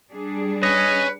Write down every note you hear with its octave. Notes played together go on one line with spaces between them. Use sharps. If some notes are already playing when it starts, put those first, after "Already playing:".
G3 D4 G#4
B4 C#5 D#5 G#5